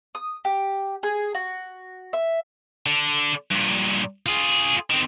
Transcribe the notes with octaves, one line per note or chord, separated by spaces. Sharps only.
D#6
G4
G#4
F#4
E5
D3 D4
G2 A#2
F4 G#4
D#3 C4